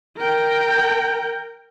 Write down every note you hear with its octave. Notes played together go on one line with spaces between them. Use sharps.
A#4 G5